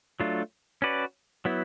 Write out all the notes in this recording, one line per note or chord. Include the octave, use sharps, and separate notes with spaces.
F#3 A3 D4 F4
C#4 F#4 B4 D5
F#3 B3 E4